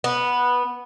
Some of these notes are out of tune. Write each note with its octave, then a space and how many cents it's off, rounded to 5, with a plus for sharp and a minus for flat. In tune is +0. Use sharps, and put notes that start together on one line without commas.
B3 -10